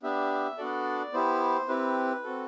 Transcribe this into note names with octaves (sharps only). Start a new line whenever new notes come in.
B3 D4 G4 E5
B3 D4 F#4 A4 D5
B3 E4 G4 C5
C4 E4 G4 B4
C4 F#4 A4